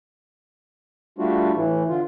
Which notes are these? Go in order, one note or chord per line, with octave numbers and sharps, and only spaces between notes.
G3 A3 D4 F4 F#4
A2 E3
D3 F4